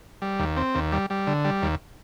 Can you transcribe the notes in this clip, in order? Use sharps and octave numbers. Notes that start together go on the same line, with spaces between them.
G3
D#2
C4
D#2
G3
G3
D3
G3
D#2